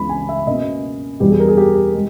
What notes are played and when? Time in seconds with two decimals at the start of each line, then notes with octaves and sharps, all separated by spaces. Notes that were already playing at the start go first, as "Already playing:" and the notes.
Already playing: C#2 C#3 E3 G#3 B3 B5
0.09 G#5
0.29 E5
0.47 B2 A#3 C#4 D#5
1.20 E2 B2 G3 G4
1.30 G#4
1.39 A#4
1.48 G#4
1.57 G4
1.94 G#3